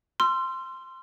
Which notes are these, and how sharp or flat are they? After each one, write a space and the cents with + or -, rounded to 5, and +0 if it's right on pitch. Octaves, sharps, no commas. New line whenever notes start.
C6 +0 E6 +45